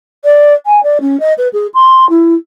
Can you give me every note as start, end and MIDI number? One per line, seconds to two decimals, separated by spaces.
0.24 0.53 74
0.66 0.82 80
0.83 0.98 74
1.00 1.19 61
1.20 1.33 75
1.38 1.48 71
1.53 1.67 68
1.74 2.08 84
2.09 2.34 64